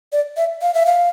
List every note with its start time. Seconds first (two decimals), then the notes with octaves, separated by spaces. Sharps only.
0.12 D5
0.37 E5
0.62 F5
0.74 E5
0.86 F5